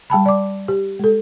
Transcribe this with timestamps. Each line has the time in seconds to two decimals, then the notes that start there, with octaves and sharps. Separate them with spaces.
0.10 G3 G5 A5 B5
0.26 D5 D6
0.68 G4
0.99 G#3 A4